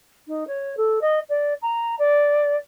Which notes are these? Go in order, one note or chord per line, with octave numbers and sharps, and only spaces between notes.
D#4
C#5
A4
D#5
D5
A#5
D5